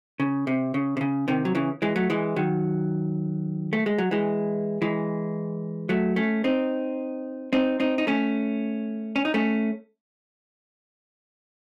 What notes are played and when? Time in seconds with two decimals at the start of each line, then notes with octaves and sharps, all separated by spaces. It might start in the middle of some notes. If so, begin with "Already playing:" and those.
0.20 C#3
0.47 C3
0.74 C#3
0.97 C3
1.01 C#3
1.28 C3 D#3
1.45 F#3
1.55 C#3 E3
1.82 E3 G#3
1.96 F#3 A3
2.10 E3 G#3
2.36 D#3 F#3
3.73 A3
3.86 G#3
3.98 F#3
4.11 E3 G#3
4.82 E3 G#3
5.89 F#3 A3
6.16 A3 C#4
6.44 C4 D#4
7.53 C4 D#4
7.80 C4 D#4
7.98 D#4
8.07 A3 C#4
9.16 C#4
9.25 D#4
9.34 A3 C#4